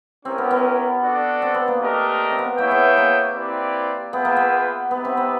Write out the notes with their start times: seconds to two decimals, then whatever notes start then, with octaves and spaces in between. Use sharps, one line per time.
0.25 C4 C#4 E4 G4 A#4
0.38 B3
0.51 B3
1.03 D4 F#4 A4 D5
1.42 C4
1.54 B3
1.68 A#3
1.81 A3 D4 G4 A#4 D#5
2.31 C4
2.39 B3
2.58 A#3 E4 G#4 C#5 E5 G5
2.71 B3
2.97 A#3
3.36 C4 E4 G4 B4 D5
4.13 B3 F4 G#4 B4 E5 G5
4.25 A#3
4.37 B3
4.91 B3 D#4 G4 B4 E5
5.05 C4
5.17 B3